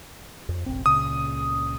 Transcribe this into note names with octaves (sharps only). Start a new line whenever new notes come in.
F2
F1 A#1 C4
C#2 A#2 C#3 D#6